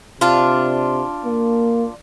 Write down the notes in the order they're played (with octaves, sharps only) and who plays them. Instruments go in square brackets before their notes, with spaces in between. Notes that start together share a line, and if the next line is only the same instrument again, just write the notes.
[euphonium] C3 [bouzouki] D4 F4
[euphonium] A#3